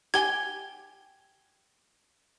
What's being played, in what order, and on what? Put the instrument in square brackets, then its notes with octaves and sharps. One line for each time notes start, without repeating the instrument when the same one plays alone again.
[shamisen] G4 G5 G#5 [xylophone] G#6 G7